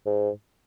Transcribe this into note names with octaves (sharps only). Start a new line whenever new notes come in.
G#2